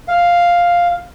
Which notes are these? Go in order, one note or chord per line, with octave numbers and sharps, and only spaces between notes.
F5